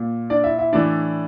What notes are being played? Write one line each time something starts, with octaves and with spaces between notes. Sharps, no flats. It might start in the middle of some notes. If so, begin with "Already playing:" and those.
Already playing: A#2
D4 D5
E4 E5
E4 E5
A2 E3 D4 D5